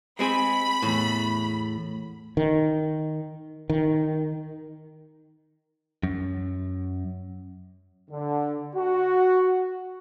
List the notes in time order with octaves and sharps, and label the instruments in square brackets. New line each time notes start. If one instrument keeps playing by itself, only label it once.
[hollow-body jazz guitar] G#3 C4 G#4 [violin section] B5
[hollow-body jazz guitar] E2 A2
[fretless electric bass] D#3
D#3
[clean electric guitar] F#2
[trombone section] D3
F#4